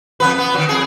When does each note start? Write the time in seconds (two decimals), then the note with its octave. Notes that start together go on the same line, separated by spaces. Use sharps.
0.20 F2 B3 B4
0.38 B3
0.54 D#3 F#3
0.69 F2 G#4